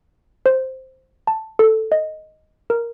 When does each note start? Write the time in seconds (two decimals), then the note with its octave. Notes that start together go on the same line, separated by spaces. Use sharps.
0.46 C5
1.27 A5
1.59 A4
1.92 D#5
2.70 A#4